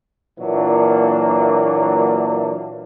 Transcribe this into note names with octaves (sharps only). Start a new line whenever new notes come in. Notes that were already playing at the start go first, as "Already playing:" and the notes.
A#2 E3 F#3 A#3 D4